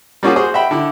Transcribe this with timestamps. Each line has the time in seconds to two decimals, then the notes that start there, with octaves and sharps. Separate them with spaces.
0.23 G3 A#3 C#4 F4 F#4 G#4
0.36 F#4 G#4 C5
0.54 E5 F#5 G5 B5
0.71 D3 E4